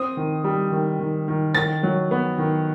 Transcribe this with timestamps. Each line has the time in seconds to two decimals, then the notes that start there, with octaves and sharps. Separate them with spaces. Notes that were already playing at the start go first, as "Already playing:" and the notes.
Already playing: C4 D#6
0.17 D#3
0.44 G3
0.72 D#3
0.99 D#3
1.28 D#3
1.55 D#3 A6
1.83 F#3
2.11 B3
2.38 D#3